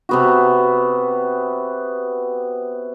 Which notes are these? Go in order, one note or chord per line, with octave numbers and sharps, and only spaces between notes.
C3 B3 F#4